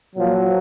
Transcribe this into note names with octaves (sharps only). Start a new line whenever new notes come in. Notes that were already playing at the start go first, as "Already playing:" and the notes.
A#2 F3 F#3